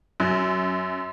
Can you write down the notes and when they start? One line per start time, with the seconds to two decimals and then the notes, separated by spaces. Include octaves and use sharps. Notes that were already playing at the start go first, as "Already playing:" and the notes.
0.20 F#2